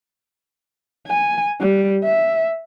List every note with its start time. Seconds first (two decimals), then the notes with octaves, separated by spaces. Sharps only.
1.08 G#5
1.60 G3
2.04 E5